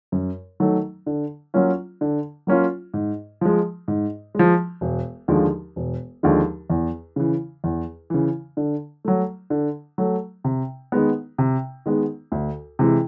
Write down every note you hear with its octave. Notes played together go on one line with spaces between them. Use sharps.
F#2
D#3 F#3 A3
D3
F#3 A#3 C#4 F4
D3
F#3 A#3 C#4 F4
G#2
F3 G#3
G#2
F3 G#3
E1
D#2 D3 F3 G#3
E1
D#2 D3 F3 G#3
E2
C#3 E3
E2
C#3 E3
D3
F#3 A3
D3
F#3 A3
C3
D#3 G#3 B3
C3
D#3 G#3 B3
D2
C3 E3 G#3